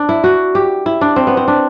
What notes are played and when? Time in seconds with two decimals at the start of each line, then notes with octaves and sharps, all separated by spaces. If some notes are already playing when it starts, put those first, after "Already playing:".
Already playing: D4
0.09 E4
0.24 F#4
0.55 G4
0.86 E4
1.01 D4
1.16 C4
1.27 B3
1.37 C4
1.48 D4